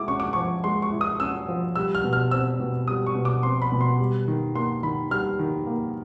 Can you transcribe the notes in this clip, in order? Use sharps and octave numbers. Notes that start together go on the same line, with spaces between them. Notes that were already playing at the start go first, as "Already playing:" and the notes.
Already playing: G#3 E4 D6
C#4 C#6
D6
F3 C#6
G#3 C6
C#6
E4
D#6
C#4 E6
F3
G3 E6
F6
B2
F6
C4 E6
B2
G3 D#6
C#6
B2
D6
C4 C6
B5
B2
C6
G3
D#3
A#3 C6
D#3 B5
G3 F6
D#3
A#3